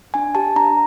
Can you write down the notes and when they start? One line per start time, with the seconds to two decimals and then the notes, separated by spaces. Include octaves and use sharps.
0.14 D4 G#5
0.35 G4 A5
0.56 D4 A#5